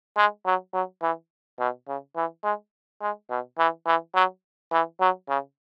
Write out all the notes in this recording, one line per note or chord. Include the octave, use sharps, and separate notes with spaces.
G#3
F#3
F#3
E3
B2
C#3
E3
G#3
G#3
B2
E3
E3
F#3
E3
F#3
C#3